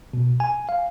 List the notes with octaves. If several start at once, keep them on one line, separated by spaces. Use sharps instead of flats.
B2
G#5
F5